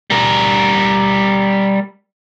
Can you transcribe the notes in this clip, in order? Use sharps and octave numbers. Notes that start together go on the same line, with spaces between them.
G3 A#4